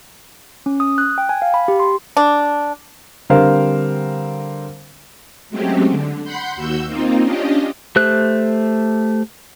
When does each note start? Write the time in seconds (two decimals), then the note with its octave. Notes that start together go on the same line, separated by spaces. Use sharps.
0.66 C#4
0.80 D#6
0.98 F#6
1.18 G5
1.29 G#5
1.42 F5
1.54 B5
1.68 G4
1.80 C6
2.17 D4
3.30 D3 G3 C4 A#4 C5 F5
5.50 F#3 G#3 A3 C4 C#4 G4
5.91 D3
6.24 F#5 B5 C6 G6
6.56 D#2 F#4 E6 G6
6.86 A#3 C4 D#4 F4
7.22 C#4 D4 F4 G4 D#5
7.96 A3 G4 C5 F#6